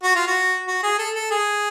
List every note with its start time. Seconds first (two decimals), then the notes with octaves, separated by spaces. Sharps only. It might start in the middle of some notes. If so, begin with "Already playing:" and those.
0.03 F#4
0.15 F4
0.27 F#4
0.68 F#4
0.83 G#4
0.99 A4
1.15 A4
1.31 G#4